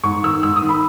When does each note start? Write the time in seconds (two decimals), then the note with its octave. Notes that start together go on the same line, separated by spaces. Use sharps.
0.04 G#2 C#6
0.23 D#3 E6
0.43 G#2 E6
0.56 D#6
0.62 D#3
0.69 B5